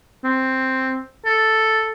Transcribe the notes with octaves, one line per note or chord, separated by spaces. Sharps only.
C4
A4